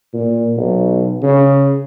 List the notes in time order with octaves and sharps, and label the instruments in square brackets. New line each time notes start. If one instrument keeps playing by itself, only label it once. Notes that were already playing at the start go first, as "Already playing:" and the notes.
[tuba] A#2
B1
C#3